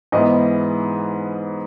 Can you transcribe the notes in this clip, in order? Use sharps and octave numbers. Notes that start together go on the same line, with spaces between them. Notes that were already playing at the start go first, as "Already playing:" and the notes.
G#2 E3 B3 D#5